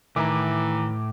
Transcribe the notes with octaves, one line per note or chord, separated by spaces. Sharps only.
A2 D#3 E3 A#5 D6